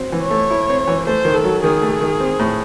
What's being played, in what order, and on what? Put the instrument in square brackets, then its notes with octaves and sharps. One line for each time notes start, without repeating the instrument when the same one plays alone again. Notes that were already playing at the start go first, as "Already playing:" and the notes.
Already playing: [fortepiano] F#3 C4
E3
[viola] C#5
[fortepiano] A3
E4
C4
E3
[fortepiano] A3 [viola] C5
[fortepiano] D#3
[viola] A4
[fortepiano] F#3
[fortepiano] D#3 [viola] G#4
[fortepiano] A3
D#3
C4
A2